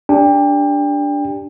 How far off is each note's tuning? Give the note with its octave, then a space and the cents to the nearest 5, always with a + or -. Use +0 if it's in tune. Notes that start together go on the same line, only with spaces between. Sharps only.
D4 -10 G4 +0 G5 +30